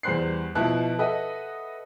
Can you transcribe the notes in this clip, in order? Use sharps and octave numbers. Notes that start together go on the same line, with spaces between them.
E2 G3 C5 F#6 C7
B2 F3 E4 A5 F#6
A4 B4 D#5 E5 F#5